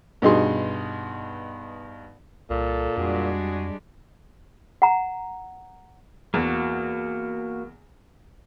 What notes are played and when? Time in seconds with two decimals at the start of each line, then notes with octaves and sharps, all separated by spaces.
0.22 G2 B2 D#4 G#4 C6
2.50 C2 A#2 A4
2.97 F2 G3 G#3 D4 F#4 G#4
4.82 F#5 A#5
6.34 E2 A#3 F#4